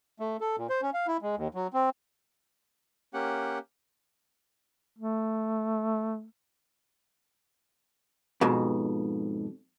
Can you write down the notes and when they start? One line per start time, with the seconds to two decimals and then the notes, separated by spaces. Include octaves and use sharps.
0.20 A3
0.41 A4
0.57 A#2
0.69 C5
0.82 C#4
0.94 F5
1.07 E4
1.22 G#3
1.36 D#2
1.54 F#3
1.74 C4
3.14 A#3 C#4 G4 F#5
4.99 A3
8.41 F2 G#2 B2